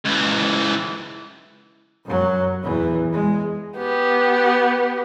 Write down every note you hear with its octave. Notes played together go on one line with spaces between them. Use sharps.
C#2 E3
F#2 F#3
E2 E3
G#3
B3 G4